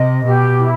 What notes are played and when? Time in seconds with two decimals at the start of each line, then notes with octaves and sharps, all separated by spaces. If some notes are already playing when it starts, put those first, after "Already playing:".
Already playing: C3 D#5
0.24 B2 G4
0.59 E4